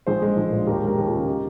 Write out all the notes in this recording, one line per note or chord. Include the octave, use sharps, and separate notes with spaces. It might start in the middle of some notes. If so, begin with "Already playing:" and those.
A#1 G#4 C5
G#3
A#1
A#2
D#2 G4 A#4
G#3
G4 A#4
D#2
F4 G#4
C#3
D#4 G4